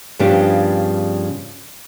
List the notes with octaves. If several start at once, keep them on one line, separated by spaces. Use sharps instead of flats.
G2 C#3 F3 B3 D4 G4